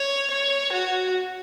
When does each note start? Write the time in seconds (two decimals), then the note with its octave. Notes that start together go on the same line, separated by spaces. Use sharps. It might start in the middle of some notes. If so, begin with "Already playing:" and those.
Already playing: C#5
0.31 C#5
0.73 F#4